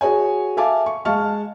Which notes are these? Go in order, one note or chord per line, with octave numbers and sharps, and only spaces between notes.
F#4 G#4 C#5 G#5
A4 E5 F5 G#5 A5 D6
C#6
G#3 F5 A5 C#6 F6